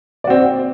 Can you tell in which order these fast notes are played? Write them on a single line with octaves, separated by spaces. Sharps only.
D5 F#4 C4